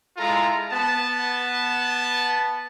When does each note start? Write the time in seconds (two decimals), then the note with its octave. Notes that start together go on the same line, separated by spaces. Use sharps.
0.17 G#3 E4 F4 A4 A#5
0.71 B3 A5